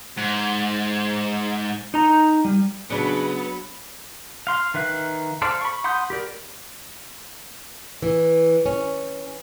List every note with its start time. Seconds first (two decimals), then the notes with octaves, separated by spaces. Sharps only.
0.17 G#2
1.94 D#4 A#5
2.45 G3
2.90 C#3 F#3 B3 D4 B5
4.47 F5 C6
4.74 D#3 B4 E5 F5 F#6
5.42 A4 C5 D5 F5
5.61 B5 C#6
5.84 F#5 B5 C6 D#6 G6
6.10 G4 A#4 D5
8.02 E3
8.66 C#4